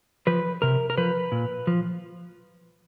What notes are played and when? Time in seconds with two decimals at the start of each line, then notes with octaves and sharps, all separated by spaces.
0.27 F3 B4
0.62 C3 A#4
0.90 A#4
0.98 F3 B4
1.32 A#2
1.67 F3